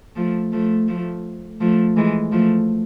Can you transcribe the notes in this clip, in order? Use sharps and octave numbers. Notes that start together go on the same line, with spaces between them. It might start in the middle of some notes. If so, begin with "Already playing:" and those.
F3 A3
F3 A3
F3 A3
F3 A3
E3 G#3
F3 A3